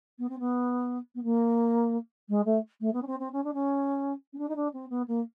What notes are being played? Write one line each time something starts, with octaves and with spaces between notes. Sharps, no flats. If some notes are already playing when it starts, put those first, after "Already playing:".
B3
C4
B3
B3
A#3
G#3
A3
A3
B3
C#4
C4
C4
C#4
D4
C#4
C#4
D4
D#4
D4
C4
B3
A#3